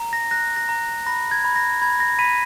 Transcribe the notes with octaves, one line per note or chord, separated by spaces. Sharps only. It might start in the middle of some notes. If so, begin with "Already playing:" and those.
Already playing: A#5
A#6
F#6 A#6
A#6
A#5
B5 A#6
G#6
B5
A#6
B5 G#6
A#6
B5 B6 D#7